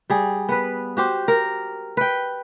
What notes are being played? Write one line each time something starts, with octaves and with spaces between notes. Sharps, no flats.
G3 G#4
B3 B4
F#4 G4 C5
A#4
B4 G5